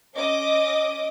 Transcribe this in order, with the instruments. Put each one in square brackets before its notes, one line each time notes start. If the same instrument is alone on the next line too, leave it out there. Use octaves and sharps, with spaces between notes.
[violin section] C#4 D#5 D6 D#6